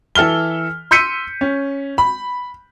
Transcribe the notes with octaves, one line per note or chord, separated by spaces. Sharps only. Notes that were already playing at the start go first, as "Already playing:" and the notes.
E3 A4 E5 F6 G7
C6 E6 G6 B6 C#7 D#7
C#4
B5